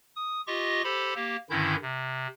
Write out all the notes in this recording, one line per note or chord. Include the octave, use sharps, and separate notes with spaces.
D#6
F4 G4 D#5 C#6 A#6
G4 A4 C5 B5
A#3 G4
G2 D3 D#3 C#4 E4 G6
C3